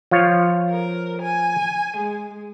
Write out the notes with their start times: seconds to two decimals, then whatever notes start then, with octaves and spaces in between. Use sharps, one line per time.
0.11 F3 F4 C#5
0.70 A#4
1.22 G#5
1.97 G#3